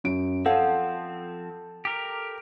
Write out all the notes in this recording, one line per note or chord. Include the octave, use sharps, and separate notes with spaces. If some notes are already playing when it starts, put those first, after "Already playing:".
F#2 D7
F3 C4 A4 C#5 F5 F#5
G4 A#4